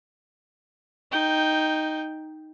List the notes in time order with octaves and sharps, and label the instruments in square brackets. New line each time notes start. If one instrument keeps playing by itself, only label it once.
[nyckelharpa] D#4 G5